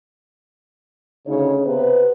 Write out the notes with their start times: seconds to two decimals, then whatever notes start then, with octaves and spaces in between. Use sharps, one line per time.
1.27 D2 C#3 D#4 C#5
1.66 C3 B3 B4